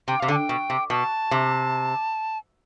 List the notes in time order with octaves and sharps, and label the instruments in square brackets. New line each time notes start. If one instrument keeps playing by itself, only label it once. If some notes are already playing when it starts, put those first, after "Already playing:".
[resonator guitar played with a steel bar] C3 [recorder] G5
[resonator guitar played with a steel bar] C3 [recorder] F5
[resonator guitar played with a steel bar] D3
[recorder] A5
G5
[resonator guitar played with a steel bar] B2
C3
[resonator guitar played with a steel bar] B2 [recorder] A5
[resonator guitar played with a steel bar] C3